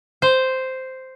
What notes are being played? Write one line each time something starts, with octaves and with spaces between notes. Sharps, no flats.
C5